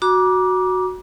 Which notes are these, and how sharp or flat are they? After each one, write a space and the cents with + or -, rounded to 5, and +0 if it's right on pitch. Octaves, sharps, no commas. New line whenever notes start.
F#4 -5 A#5 +40 D6 +0